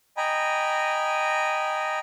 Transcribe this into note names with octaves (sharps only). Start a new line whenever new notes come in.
D#5 G5 G#5 A#5 B5